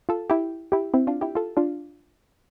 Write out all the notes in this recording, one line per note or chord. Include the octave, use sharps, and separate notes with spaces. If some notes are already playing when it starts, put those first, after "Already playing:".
F4 A4
E4 G4
E4 G4
C4 E4
D4 F4
E4 G4
F4 A4
D4 F4